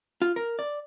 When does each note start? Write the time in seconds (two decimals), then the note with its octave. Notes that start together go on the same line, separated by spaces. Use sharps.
0.22 F4
0.36 A#4
0.59 D5